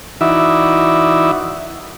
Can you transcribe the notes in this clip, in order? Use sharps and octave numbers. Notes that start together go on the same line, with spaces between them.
E3 D#4 E4 F#4 D5 E5